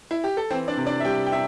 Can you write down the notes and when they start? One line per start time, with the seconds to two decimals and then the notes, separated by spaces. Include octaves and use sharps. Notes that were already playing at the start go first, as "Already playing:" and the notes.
0.11 E4
0.24 G4
0.37 A4
0.50 E3 C4 C5
0.68 D4 D5
0.77 C3
0.86 D4 D5
1.00 E5
1.05 G3 G4 G5
1.26 G5
1.32 C3 E5